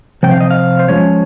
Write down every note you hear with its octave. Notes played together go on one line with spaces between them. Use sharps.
C3 F3 G5
F5
D#5
F5
C5
F3 G#3 C#4 C#5